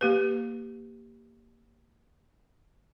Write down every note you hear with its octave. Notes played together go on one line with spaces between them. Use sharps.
A#3 G4 B4